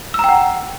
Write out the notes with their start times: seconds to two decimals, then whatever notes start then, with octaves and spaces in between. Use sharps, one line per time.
0.14 E6
0.19 A#5
0.24 G5
0.29 F#5